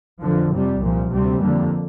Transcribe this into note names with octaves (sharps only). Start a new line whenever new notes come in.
F2 D3 F3
F2 C3 G3
C2 A#2 F3
D2 C3 G3 C4
F2 D3 G3 A#3